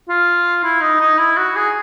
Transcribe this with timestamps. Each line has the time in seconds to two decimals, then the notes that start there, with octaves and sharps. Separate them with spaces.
0.09 F4
0.64 E4
0.81 D#4
1.00 D#4
1.18 E4
1.37 F#4
1.56 G#4